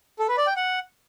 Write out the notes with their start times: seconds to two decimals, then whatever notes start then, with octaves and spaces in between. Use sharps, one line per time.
0.19 A4
0.28 B4
0.38 D5
0.47 G5
0.56 F#5